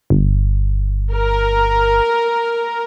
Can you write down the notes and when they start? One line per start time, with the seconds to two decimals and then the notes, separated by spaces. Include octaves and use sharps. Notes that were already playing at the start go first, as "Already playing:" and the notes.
0.10 G1
1.13 A#4